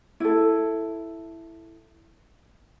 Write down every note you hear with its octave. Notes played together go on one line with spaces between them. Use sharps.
E4 A4